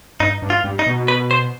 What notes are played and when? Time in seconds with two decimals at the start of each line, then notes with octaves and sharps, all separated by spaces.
0.20 G2 D#4
0.42 G2
0.50 F4
0.64 G2
0.79 D#4
0.87 B2
1.08 B4
1.31 C5